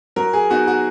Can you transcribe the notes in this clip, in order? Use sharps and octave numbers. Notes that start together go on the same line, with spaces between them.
F#3 A#4
G#4
B3 D#4 F#4
F#4